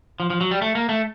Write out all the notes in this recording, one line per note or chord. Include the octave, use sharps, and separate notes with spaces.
F3
F3
F#3
G3
A3
A#3
A3